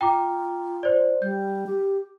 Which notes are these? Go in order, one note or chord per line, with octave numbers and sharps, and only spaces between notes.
F4 G5 A#5 D6
C5 D5
G3 G6
G4